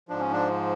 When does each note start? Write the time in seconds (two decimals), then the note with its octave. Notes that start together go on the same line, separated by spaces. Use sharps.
0.09 G#2 F3 D4
0.20 C#4
0.32 D4